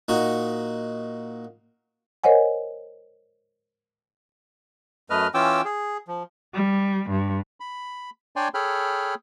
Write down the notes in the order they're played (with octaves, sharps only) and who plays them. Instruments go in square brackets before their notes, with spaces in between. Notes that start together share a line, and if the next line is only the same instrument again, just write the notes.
[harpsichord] A#2 D#4 F#4
[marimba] A#4 C5 C#5 D#5 F#5 G#5
[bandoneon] F#2 A3 B4 D#5 F6
E3 C#4 F4 G5 D6 E6
G#4
F3
[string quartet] G3
G2
[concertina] B5
D4 C#5 D5 G5 G#5 C6
G#4 A4 C#5 G5 B5 F6